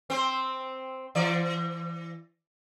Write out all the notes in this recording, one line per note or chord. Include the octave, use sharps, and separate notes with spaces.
C4 C5
E3 D5